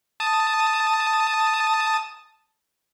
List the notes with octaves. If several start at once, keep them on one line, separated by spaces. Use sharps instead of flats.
A5 D#6